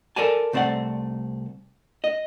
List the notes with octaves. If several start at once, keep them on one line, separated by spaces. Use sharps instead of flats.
A4 A#4 C5 D5 G#5 A5
C2 A3 C4 D5 F#5
D#5